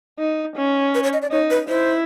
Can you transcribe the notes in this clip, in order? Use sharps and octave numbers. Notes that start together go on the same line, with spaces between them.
D#4
C#4
B4
C#5
D#5
D5
D#4 C#5
B4
E4 C5